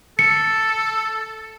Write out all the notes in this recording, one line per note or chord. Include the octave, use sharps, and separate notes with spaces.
A4 C#7